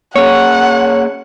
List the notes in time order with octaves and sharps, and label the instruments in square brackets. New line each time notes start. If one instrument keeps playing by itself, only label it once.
[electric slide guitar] A#3 C#4 G#4 [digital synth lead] C#5 [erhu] F#5